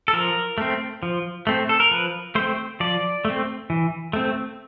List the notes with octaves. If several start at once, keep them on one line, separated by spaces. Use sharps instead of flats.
A4
F3 A#4
A3 C4
F3
A3 C4
A4
A#4
F3 B4
A3 C4 C5
F3 D5
A3
C4
E3
A3 C4